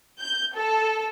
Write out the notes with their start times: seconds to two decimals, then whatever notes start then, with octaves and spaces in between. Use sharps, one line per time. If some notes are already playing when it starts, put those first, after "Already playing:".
0.19 G6
0.55 A4